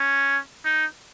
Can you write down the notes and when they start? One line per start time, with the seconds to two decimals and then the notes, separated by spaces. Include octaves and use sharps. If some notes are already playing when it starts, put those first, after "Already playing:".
Already playing: C#4
0.65 D#4